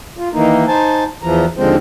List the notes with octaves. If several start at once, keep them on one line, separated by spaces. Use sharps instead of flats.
F4
D#3 E3 A#3 D#4
D#4 C5 G#5 A5
E2 E3 F3 A#5
D#2 D3 F3 G#3 C4 C5